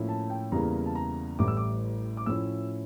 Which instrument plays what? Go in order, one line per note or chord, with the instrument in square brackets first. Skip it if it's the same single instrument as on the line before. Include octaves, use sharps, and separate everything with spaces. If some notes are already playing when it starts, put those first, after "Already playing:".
Already playing: [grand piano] A2 F3 A#3 C#4 E4
A5
G5
E2 C#3 G3 A#3 E4 A#5
A5
A#5
A1 A2 G3 D6
E6
D6
D6
A2 F3 C#4 E4 E6